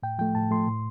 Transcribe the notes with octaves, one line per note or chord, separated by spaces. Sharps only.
A2 G5
F3 A3 G5
A2 A5
F3 A3 C6
A2